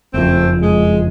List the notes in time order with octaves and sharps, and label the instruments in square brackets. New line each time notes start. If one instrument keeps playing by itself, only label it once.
[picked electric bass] F#1 F2 [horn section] A3 C4
[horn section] G#3